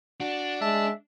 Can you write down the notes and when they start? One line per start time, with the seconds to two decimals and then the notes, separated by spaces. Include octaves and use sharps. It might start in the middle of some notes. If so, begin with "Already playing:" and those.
0.20 D4 F#4
0.61 G#3 E5 A5